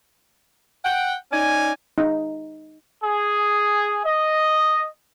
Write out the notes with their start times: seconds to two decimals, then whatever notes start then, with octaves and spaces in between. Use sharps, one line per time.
0.85 F#5 G5
1.31 C#4 D#4 D5 G#5
1.98 D#4
3.03 G#4
4.05 D#5